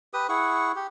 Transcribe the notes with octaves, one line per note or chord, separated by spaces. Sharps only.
G4 B4 D#6
E4 G#4 F#5 C#6
G4